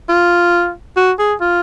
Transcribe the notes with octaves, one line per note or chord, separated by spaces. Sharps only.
F4
F#4
G#4
F4